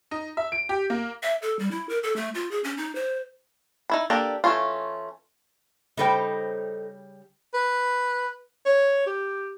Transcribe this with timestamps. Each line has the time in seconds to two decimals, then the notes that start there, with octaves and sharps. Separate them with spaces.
0.11 D#4
0.37 E5
0.52 D7
0.69 G4
0.90 A#3
1.23 E5
1.42 A4
1.59 G3
1.71 E4
1.89 A#4
2.03 A4
2.16 A3
2.35 F4
2.51 G#4
2.64 C#4
2.77 D#4
2.95 C5
3.90 D#4 E4 B5
4.10 A#3 D4 G4 A4 A#5
4.44 E3 A3 C4 C#4 F4
5.97 C#3 G3 D#4 A4 C5 G5
7.54 B4
8.66 C#5
9.07 G4